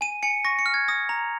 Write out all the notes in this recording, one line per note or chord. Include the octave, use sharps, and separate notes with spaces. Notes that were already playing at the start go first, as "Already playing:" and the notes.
G#5 D#7
G#5 C#7
C#6 A#6
C#7
F6
G#6
D#6 A#6
A#5 F7